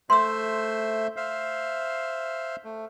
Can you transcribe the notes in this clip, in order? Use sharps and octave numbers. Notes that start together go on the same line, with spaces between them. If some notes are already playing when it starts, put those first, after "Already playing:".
A3 C5 E5 C6 E6
C5 E5 F5
A3